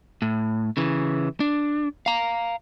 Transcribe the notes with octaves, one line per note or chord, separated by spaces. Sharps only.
A2
C#3 E3
D4
F5 A#5